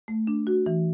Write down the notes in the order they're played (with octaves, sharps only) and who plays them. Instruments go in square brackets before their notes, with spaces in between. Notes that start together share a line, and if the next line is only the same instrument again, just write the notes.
[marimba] A3
D4
F#4
E3